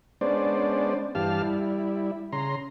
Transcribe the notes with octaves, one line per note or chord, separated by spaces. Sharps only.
G#3 B3 C#4 D4 C5 D5
G2 E3 G4 F5 A5 F6
G3 E4
C#3 A#5 C6